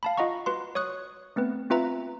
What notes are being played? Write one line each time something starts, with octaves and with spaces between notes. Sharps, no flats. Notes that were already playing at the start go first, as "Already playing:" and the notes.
F5 A5 B5
F4 D#5 F#5 A#5 C#6
F#4 B4 C6
C#5 C#6 D#6 F#6
A3 B3 C4 B4
C4 F4 B4 E5 A#5